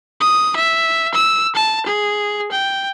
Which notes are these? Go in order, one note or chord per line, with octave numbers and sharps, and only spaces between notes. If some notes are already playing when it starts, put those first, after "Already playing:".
D#6
E5
E6
A5
G#4
G5